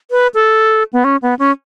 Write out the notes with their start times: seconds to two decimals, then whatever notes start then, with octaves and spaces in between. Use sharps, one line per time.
0.11 B4
0.34 A4
0.93 B3
1.04 C#4
1.22 B3
1.39 C#4